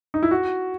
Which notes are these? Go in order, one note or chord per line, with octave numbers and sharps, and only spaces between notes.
D#4
E4
F#4